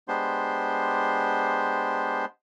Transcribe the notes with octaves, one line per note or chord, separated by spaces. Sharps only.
G#3 B3 D4 G4 C5 C6